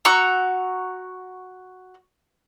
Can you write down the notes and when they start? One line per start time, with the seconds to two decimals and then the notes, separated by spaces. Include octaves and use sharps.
0.05 F#4 A#5 C#6 E6